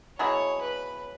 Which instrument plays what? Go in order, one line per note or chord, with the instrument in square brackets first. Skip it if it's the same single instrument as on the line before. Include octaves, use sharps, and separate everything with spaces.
[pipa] B2 F#3 E4 G#4 [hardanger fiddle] C#5
[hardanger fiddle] B4